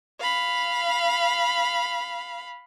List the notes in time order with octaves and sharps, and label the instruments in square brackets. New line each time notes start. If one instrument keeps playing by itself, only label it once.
[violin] F5 B5